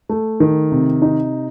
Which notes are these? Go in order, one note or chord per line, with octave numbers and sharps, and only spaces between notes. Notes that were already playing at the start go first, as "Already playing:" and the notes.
A3
D#3
C3
D#4